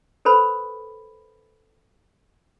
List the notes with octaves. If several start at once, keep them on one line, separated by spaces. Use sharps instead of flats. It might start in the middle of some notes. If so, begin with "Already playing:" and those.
A4 B4 C5 B5